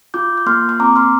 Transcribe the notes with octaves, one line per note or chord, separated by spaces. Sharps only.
F4 D6 G6
G6
A#3 C6 F6
C6
C4 A#5 D6
C6 F6